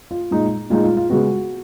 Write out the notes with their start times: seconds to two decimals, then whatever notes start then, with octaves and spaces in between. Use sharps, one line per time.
0.11 F4
0.31 A#2 G#3 D#4
0.70 A#2 G#3 D#4 F4
0.84 F4
0.97 F4
1.10 C#3 G#3 B3 F#4